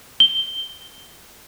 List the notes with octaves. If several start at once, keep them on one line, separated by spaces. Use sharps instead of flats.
G7